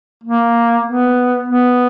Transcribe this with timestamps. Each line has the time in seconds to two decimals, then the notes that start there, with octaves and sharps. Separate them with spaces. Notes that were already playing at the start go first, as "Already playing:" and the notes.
0.24 A#3
0.87 B3
1.49 B3